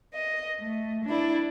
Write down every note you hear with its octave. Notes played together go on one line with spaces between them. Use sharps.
D#5
A3
D4 E4 D5